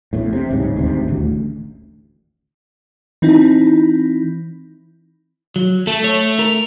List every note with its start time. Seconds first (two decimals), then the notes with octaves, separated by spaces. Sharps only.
0.13 A#1 E2 A2
0.33 C3
0.51 D1 C2 G#2 C#3
0.76 D#1 D2 G#2 C3
1.08 D#1 A1 D2
3.22 E3 C4 D#4 E4
5.56 F#3
5.87 A3 A4
6.04 C#5
6.39 A#4